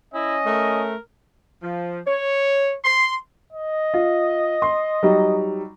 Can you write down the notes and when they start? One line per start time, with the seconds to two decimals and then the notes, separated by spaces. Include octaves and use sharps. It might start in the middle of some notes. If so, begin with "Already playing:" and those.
0.14 C#4 E4 D#5
0.46 A3 A#4
1.62 F3
2.06 C#5
2.84 C6
3.53 D#5
3.94 F4
4.62 C6
5.03 F#3 G3 D#4